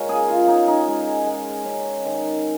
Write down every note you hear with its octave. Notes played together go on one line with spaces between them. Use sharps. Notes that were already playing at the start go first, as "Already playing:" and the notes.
Already playing: G#3 A#4 C#5 F5
C#3 G#4
F4
G#3 D#4
D#4
G#3
G#3
C#4
D#3